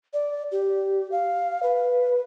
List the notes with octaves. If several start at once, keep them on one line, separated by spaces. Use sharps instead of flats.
D5
G4
F5
B4